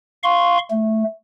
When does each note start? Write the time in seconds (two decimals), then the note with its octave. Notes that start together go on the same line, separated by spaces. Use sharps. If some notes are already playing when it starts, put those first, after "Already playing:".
0.23 F5 C6 C#6
0.71 A3